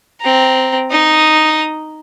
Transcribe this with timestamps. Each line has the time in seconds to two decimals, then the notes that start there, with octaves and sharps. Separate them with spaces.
0.21 C4 A#5
0.91 D#4 D#6